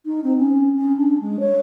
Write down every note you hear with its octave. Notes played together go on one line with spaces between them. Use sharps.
D#4
C4
C#4
C#4
D4
G#3
C#5